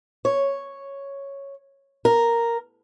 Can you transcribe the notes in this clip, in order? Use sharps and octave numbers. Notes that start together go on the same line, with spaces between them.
C#5
A#4